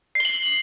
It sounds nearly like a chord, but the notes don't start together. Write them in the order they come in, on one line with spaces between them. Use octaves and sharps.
C7 G7 F#7